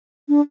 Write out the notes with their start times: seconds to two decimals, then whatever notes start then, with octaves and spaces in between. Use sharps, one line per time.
0.29 D4